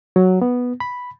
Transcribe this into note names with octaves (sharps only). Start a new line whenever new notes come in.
F#3
B3
B5